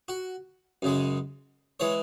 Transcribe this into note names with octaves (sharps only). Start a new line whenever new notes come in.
F#4
F#2 C#3 G#3
E3 G#3 C#5